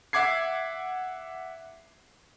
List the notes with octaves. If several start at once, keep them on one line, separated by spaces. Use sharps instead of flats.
E5 F#5 D6 G#6 C7